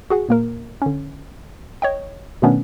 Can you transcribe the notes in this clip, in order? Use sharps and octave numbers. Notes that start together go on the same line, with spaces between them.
F#4 G#4 F#5
A#2 A#3 A#4
D3 C#4
C#5 D#5 G5
B2 D#3 A3 B3 C#4 D4